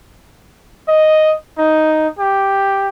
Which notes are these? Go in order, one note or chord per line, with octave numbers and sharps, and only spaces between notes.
D#5
D#4
G4